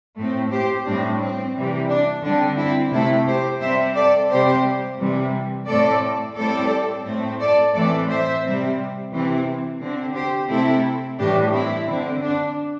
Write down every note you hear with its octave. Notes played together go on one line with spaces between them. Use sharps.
A2 A3 C4
G4 C5
A2 G3 C4 D4
C4
C3 E3 G3
D4
D3 G3 C4 D4
C4 E4
C3 A3 C4 E4 A4
G4 C5
C3 G3 C4 C5 E5
A4 D5
C3 G3 C4 G4 C5
C3 E3 G3
A2 A3 C4 A4 D5
A2 G3 C4 A4 D5
A2 A3 C4
A4 D5
A2 E3 A3 C4 A4 D5
C5 E5
C3 G3 C4
C3 E3 C4
D3 C4
G4 C5
C3 A3 C4 E4 A4
A2 E3 G3 D4 G4
C4 E4
D3 C4
D4